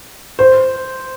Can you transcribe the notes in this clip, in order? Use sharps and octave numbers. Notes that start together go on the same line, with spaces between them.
C5